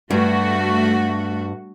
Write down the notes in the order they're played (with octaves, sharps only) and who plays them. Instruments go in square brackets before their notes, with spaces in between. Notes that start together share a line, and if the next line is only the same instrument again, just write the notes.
[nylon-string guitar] G2 [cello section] A3 F#4